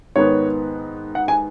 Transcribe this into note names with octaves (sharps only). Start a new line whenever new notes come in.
G#2 D#3 B3 C#5
F#5
G#5